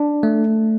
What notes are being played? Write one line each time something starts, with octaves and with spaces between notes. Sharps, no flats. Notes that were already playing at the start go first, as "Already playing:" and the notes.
Already playing: D4
A3